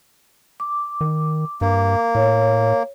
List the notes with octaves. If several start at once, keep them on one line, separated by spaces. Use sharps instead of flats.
D6
D#3
G2 A#3
A2 C#5